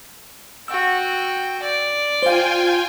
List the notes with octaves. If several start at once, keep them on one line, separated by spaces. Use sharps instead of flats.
F#4 G5 E6
D5
F4 C5 F5 G5 G#5